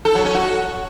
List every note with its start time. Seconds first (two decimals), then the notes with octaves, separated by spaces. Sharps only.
0.05 A4
0.15 F#3
0.25 C#4
0.35 F#4